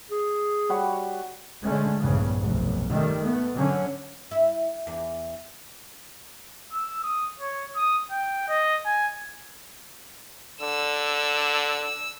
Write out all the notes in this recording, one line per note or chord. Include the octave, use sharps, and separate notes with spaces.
G#4
G3 F#4 C#5
D3 G#3 A3 C#4
A#1 E2 G2 C#3
F1 B1
D#3 G3 A3
A3 B3
D3 F#3 C#4
E4
E2
E6
D#6
C#5
D#6
G5
D#5
G#5
D3 E6